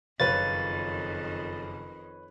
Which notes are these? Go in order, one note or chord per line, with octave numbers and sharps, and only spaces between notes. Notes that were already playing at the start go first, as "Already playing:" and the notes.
F#1 F2 D#3 F4 B4 C#5 A6